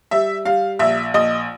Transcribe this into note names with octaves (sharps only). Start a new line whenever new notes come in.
G3 E5
G3 F5
A#1 E5
A#1 D#5